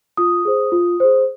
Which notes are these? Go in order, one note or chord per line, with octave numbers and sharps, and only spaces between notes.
F4 D#6
G#4 C5
F4
G#4 C5